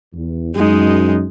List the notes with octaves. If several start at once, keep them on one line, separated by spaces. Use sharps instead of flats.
E2
F#2 G#3 D#4